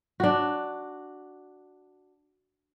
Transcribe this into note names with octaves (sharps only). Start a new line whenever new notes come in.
D4 F#4